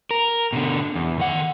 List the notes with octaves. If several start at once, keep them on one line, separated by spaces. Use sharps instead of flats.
A#4
B2 D3
E2
D#3 F#5